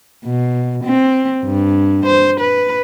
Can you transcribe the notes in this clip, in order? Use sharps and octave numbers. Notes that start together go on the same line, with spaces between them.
B2
C4
G2
C5
B4